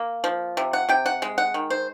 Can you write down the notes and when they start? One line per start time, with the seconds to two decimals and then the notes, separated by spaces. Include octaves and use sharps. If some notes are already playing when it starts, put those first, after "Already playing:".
Already playing: A#3
0.24 F3
0.57 C3
0.73 F#5
0.89 C3 G5
1.06 F#5
1.22 G#3
1.38 F#5
1.54 D#3
1.70 C5